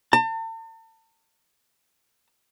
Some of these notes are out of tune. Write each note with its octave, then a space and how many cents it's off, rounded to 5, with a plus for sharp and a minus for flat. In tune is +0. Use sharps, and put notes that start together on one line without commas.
A5 +40